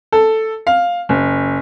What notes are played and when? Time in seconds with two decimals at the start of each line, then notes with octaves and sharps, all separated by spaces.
0.12 A4
0.67 F5
1.09 F#1